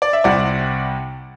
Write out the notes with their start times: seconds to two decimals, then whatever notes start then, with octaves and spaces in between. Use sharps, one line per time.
0.02 D5
0.13 E5
0.24 C2 C3 G3 D5 F#5